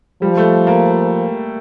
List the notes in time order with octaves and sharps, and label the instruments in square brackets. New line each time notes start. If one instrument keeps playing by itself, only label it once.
[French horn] F3 [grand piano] G3
[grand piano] A3
A#3